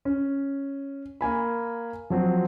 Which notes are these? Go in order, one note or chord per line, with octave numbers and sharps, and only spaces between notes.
C#4
A#3 G#5 B5
F3 F#3 C4